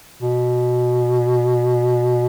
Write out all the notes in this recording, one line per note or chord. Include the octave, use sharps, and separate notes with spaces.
B2